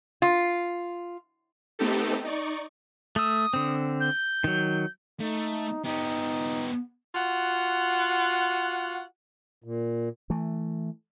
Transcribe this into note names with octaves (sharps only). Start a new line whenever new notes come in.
F4
A3 B3 C4 D#4 G4 A4
D#4 D5 C#6
A3 D#6 E6
D3 C4
G6
D#3 F#3
A3 D#4
B3 D#4 G4
F4 F#4 F#5
A#2
E3 A3